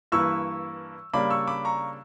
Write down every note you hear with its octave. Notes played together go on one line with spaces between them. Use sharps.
G2 E3 A#3 E4 B4 C#6 E6
C#3 G3 A#3 D4 B5 D6
C#6 E6
B5 D6
A#5 C#6